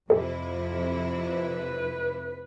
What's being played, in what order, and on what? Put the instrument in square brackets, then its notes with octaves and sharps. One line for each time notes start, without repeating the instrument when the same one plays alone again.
[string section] F2 C3 E4 [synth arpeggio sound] G4 A4
[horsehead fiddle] B4